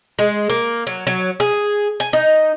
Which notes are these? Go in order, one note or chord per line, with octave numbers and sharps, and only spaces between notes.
G#3
A#3
F#3
F#3
G#4
G#5
D#4